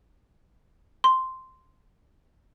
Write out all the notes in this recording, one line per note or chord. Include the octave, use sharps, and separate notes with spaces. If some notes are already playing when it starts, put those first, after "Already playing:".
C6